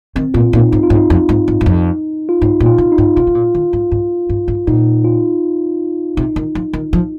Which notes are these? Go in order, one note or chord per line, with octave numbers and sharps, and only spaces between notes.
D#3 C4
A#2 F4
A#2 D#4
G#2 D#4
F4
G#2
D#4
F2
G#2
G#2
G#2
F2
F4
G#2 D#4
A#2
F4
C3
D#4
G#2
C3 F4
C3
A#2
D#3
G#2
G#2
G#2
G#2
A#2 D#4
F4
C3 D#4
D#3
F3
D#3
F3